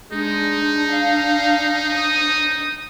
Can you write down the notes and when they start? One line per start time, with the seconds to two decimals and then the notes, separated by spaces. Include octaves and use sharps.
0.12 G#3 D4 D#4
0.92 F5
1.94 D#6